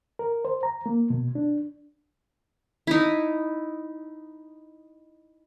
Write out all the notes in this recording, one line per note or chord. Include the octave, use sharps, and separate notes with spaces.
A#4
C5
A#5
A#3
B2
D4
D#4 E4